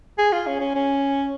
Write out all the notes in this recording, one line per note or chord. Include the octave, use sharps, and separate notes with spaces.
G#4
F4
C#4
C#4
C#4